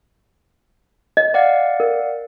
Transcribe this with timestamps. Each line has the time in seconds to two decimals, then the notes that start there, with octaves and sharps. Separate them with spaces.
1.17 D#5
1.34 D5 F5 F#5
1.80 A#4